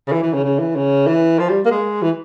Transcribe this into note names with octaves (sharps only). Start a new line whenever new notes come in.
C#3
E3
E3
C#3
C#3
E3
C#3
E3
F3
G3
A#3
G#3
E3